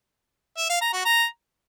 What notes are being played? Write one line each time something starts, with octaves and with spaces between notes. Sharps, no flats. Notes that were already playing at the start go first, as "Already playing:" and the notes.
E5
F5
A#5
F#4
A#5